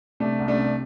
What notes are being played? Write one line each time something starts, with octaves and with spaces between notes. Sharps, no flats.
C3 A3 D4
C2
A3 D4
C3